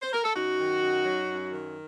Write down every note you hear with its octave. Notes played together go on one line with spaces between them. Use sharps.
C5
A#4
A4
F#2 D#4 F#4
D#3
F#2
F#3
F#2
D#3